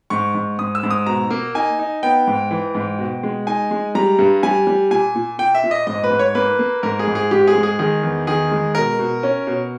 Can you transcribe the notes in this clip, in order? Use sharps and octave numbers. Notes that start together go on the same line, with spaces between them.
G#2 C#6
G#2
G#2 D#6
E6
G#2
D#6
B2 A#5
A#3
D#4 G#5
D#4
B3 G5
G#2
E3
G#2
B2
G#3
D#4 G#5
G#3
G3 A#5
G2
G3 G#5
G3
A#2 G#5
A#2
A#2 G5
E5
A#2
D#5
G#2 D#5
B4
G#2
C#5
A#3 B4
A#3
G#2 A#4
G#4
G#2
G#4
G#2 G4
G#4
G#3
G#4
D#3 G#4
E2
D#3 G#4
G#3
B2 A#4
B2
C#4
B2